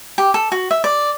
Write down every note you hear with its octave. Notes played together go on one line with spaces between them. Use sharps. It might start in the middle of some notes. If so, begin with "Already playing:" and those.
G4
A4
F#4
E5
D5